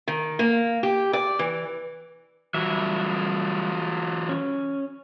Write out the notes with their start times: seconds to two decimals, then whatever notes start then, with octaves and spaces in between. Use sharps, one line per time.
0.08 D#3
0.39 A#3
0.83 G4
1.13 D5
1.39 E3
2.54 E3 F#3 G3 E5
4.29 C#4